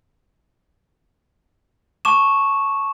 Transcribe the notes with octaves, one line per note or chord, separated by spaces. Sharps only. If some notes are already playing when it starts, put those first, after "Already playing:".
A5 C#6 D6 E7